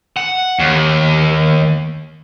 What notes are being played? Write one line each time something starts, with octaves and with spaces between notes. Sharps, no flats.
F#5
D#2